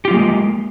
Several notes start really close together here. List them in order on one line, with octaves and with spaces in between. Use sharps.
G4 F4 F#3 A#3 G#3